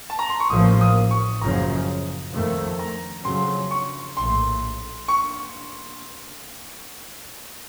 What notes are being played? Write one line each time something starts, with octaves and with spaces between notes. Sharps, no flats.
A5
A#5
C6
C#6
A1 A2 F3 A#3 D#6
D#6
C#6
F#1 F#2 C#3 F3 A#5
F2 D#3 A3
A#5
F2 C#3 F#3 C6
C#6
A#1 A2 A3 C6
C#6